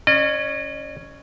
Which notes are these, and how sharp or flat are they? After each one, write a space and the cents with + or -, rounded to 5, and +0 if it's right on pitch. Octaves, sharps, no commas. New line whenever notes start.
C#4 +0 D#5 -45